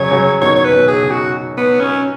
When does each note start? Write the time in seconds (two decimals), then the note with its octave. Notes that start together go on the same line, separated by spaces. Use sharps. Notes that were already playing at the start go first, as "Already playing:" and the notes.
Already playing: C#3 F#3 C#5
0.11 C#3 F#3
0.42 B2 D#3 C#5
0.56 C#5
0.65 B4
0.73 B2
0.88 G#4
1.02 C#3
1.10 F#4
1.57 B3
1.80 C#4